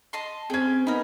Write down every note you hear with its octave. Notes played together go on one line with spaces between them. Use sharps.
D#5 A5 C6
C4 C#4 G#4 G5 G#6
B3 D#4 A#4 B5